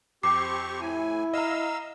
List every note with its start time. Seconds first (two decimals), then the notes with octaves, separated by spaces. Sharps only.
0.23 F2 C4 G4 C#6 D6 C7
0.81 A2 E4 G#5
1.34 D#5 F5 A#5 E6